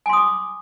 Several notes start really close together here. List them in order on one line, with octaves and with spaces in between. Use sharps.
G#5 C6 D#6 D6